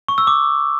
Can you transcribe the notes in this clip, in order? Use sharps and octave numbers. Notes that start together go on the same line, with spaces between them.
C#6
E6
D6